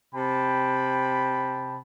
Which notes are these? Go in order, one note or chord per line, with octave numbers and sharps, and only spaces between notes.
C3 G5 A5 B5